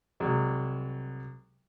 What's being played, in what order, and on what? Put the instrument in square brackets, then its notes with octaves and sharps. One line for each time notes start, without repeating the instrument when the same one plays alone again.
[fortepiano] C2 F#3 G#3